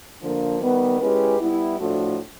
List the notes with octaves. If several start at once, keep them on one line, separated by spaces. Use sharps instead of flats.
D3 F3 A#3
D#3 G3 B3
G#3 C#4 E4 G4 B4
G3 B3 E4
A2 F3 A3 D4 F#4